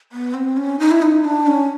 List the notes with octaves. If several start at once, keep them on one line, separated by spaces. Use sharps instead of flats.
B3
C4
C#4
D#4
E4
D#4
D4
C#4